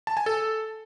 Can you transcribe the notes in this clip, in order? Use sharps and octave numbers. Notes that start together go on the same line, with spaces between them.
A5
G#5
A4